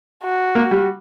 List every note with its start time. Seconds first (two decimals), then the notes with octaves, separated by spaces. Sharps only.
0.24 F#4
0.55 A#3
0.71 G3